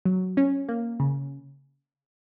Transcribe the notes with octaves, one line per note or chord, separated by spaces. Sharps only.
F#3
C#4
A#3
C#3